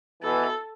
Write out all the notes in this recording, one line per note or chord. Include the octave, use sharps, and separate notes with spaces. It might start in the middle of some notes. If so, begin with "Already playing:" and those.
B2 E3 A4